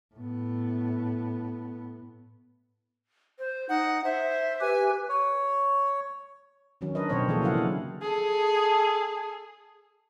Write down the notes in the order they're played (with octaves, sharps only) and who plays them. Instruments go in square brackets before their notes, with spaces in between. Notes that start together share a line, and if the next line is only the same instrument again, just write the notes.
[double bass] A2 B3
[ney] C5
[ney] D#4 [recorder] F#5
[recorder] C5 [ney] E5
[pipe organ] G4 B4 [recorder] G#5
[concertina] C#5
[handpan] D3 D#3 F#3 C#4
D4 A#4 B4 D#5
B2 D3 C4 C5 C#5
B2 E3 F3 A#3 G#4 A4
C#3 F#3 A#3 E4 F5 F#5
D3 F#3
[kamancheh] G#4 A4